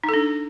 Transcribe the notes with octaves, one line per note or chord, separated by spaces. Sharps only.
D#4
A4
D4